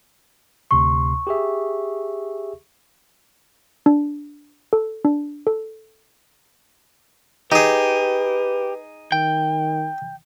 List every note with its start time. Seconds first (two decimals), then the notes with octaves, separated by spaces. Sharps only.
0.71 D2 C3 C6 C#6
1.27 G4 G#4 E5
3.86 D4
4.73 A4
5.05 D4
5.47 A4
7.52 D#4 G4 G#4 B4
9.12 D#3 G5